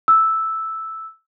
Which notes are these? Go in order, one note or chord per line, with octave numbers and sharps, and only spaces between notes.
E6